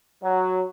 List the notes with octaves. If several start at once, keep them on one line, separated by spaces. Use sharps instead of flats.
F#3